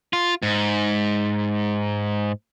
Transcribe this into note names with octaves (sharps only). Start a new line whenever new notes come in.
F4
G#2